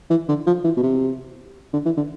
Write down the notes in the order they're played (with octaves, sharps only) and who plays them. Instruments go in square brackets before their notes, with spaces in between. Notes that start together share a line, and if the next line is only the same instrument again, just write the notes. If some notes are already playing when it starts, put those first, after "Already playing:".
[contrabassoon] E3
D3
F3
E3
B2
C3
D3
E3
D3